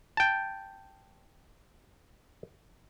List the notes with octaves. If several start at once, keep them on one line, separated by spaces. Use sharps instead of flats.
G5 A5